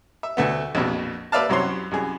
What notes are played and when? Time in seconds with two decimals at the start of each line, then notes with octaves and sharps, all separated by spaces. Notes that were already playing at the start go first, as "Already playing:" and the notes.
0.23 E5
0.37 D2 A3 B3
0.75 A#1 F2 B2
1.32 A#3 B4 D5 E5 F5 A5
1.49 C2 F#2 F#3 C4 C#5 C6
1.91 C2 F#2 G#4